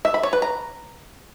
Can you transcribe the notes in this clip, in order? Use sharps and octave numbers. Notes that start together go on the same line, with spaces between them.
E5
B5
C#5
B4
A#5